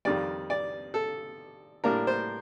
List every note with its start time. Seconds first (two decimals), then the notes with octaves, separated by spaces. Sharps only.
0.05 F2 D#3 G3 D5
0.50 D5
0.94 A4
1.84 A2 G3 A#3 D4 A#4
2.07 C5